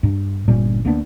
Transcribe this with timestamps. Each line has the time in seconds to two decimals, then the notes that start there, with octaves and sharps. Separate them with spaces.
0.03 G2
0.48 G1 A#2 G3 C#4
0.85 D2 A#3 B3 D4